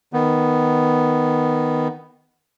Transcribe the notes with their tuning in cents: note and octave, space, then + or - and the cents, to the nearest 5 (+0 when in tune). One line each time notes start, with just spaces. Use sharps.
D#3 +0 B3 +0